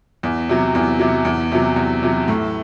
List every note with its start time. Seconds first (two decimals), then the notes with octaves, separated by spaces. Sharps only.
0.23 E2
0.49 C3 F#3
0.75 E2
1.00 C3 F#3
1.25 E2
1.52 C3 F#3
1.76 E2
2.03 C3 F#3
2.28 A2